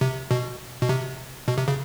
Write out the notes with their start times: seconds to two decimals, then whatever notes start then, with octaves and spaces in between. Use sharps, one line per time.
0.01 C3
0.31 B2
0.82 B2
0.89 C3
1.48 B2
1.58 C3
1.68 C#3